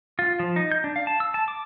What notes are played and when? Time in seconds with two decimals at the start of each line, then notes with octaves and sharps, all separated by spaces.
0.19 F4
0.39 F3
0.56 D#4
0.72 G6
0.84 D4
0.96 F5
1.07 A5
1.20 E6
1.34 A5
1.48 D6